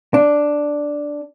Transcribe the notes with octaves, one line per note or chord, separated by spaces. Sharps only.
D4